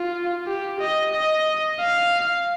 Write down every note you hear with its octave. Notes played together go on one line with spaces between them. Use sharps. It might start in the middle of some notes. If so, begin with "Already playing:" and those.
Already playing: F4
G4
D#5
D#5
F5